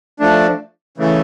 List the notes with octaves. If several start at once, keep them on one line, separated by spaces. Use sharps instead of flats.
F3 A3 D4
C#3 E3 A3